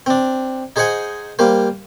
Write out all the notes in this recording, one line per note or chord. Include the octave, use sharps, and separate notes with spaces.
C4 D4
D#4 G#4 C5 D#5 F#5 G#5
G3 A#3 C5